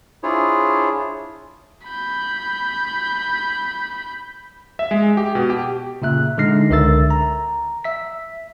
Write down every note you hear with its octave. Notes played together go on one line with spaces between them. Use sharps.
D4 E4 F4 G#4 C5 C#5
B5 G6
E5
G#3
G4
B2
G4
A#2 C#3 E5 F#6
D3 G#3 D#4 F6 A#6 C7
C#2 D3 A#4 E5 E6 A6
A#5
E5 B6